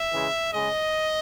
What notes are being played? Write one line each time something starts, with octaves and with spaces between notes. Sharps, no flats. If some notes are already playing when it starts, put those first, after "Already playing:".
Already playing: E5
C#3 E3 G#3
C#3 G#3 D#5